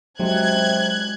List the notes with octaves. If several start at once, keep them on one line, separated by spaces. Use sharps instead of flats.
C3 F#3 G#3 F#4 G4 F#6 G#6